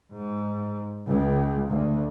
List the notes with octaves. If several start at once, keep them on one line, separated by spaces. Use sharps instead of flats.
G#2
C#2
D2